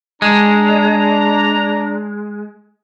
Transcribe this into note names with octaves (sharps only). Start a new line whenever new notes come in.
G#3 D4 A#5